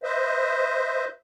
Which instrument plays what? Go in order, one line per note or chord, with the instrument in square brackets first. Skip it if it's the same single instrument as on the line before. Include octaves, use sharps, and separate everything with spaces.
[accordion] B4 C5 D#5 E5